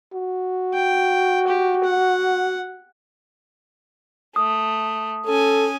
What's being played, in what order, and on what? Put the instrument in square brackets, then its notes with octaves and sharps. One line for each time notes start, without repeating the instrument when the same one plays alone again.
[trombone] F#4
[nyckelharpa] G5
G4
F#5
[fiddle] A3 [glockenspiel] D#6
[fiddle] C#4 G#5 [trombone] A4